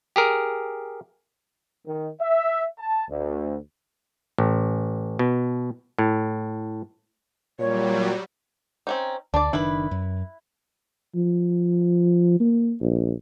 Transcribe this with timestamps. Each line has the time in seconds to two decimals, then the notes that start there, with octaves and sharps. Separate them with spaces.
0.16 G4 G#4 A#4
1.85 D#3
2.19 E5
2.77 A5
3.09 D2
4.38 A1
5.19 B2
5.99 A2
7.59 A#2 F#3 G3 C#5
8.87 C4 C#4 D#4
9.34 D2 D4 D5
9.53 F#1 D#3 D4 E4 B4
9.91 F#2
11.15 F3
12.40 A#3
12.81 A#1